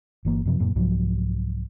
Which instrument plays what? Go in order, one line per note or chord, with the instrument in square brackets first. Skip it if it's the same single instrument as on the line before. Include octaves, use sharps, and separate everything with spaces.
[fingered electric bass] G1 E3 A#3
F#2 C3 F3
D1 F#2 A#2
C2 G#2 F3 F#3